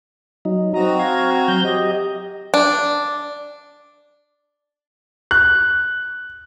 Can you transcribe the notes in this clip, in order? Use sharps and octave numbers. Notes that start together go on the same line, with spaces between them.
F#3 D#4
C4 F#4 D#5 A#5
F5 G#6
F#3 G6
G4 D#5
D4
F#6